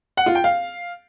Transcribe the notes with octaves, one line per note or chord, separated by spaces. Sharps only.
F#5
F4
G5
F5